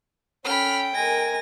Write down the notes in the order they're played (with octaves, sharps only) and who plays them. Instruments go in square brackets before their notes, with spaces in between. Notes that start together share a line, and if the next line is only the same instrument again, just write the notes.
[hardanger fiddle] C#4 A4 [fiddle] G5 [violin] B5 F6
[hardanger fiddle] G#3 A#4 [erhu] G#5 [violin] A#6